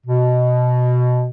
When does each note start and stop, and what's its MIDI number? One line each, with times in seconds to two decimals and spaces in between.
0.06 1.29 47